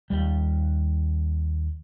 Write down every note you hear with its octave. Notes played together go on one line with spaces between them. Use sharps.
D#2 G3